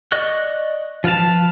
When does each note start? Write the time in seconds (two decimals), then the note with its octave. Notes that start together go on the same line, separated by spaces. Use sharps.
0.12 D5 D#5 C#6 F#6
1.04 F3 F4 B4 F5 A5